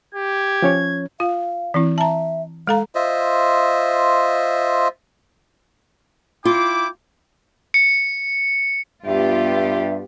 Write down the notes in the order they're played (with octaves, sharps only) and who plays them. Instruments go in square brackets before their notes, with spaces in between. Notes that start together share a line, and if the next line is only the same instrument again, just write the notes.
[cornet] G4 [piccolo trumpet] G#6
[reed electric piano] F3 C#4 C#5
[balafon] F4 [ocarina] F5
[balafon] E3 C4 E4
[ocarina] E5 [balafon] A5 A#5
[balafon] G#3 A4 A#5 [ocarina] F5
[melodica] F4 C5 D#5 E5
[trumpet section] E4 G5 D6 [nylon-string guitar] F4
[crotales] C#7
[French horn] G2 [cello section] B3 F4 G4 [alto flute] E5